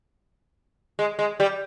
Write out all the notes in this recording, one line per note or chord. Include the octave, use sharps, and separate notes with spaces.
G#3
G#3
G3